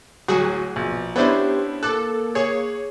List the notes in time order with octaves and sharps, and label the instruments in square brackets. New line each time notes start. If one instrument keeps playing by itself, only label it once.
[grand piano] D1 F#3 G#5 [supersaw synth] F#4 G#4
[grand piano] A#1 [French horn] B2
[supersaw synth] B3 C5 [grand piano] C#4 D4 E4 [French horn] G4
[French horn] A#3 [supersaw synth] A4 [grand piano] D6 F#6
[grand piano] G#4 [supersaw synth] C#5